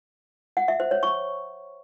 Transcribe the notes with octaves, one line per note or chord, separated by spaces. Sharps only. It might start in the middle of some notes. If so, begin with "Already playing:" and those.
F#5
E5
C5
C#5
C#6